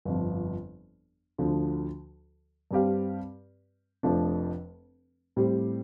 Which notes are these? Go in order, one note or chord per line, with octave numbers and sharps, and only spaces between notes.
G1 F2 F3
D2 D3 F3
G2 G3 C4 G4 F5
F1 F2 F3 A3 D4
A2 G3 C4 G4 C5